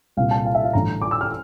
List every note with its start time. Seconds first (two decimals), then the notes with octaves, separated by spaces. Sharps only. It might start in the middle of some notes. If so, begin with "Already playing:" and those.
0.17 C2 A#2 F5
0.31 A5
0.45 F5
0.55 E5
0.64 F5
0.73 A1 G2 D3 A#5
1.02 D6
1.11 E6
1.21 F6